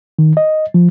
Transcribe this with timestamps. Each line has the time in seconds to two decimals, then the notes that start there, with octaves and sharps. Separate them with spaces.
0.19 D#3
0.37 D#5
0.74 F3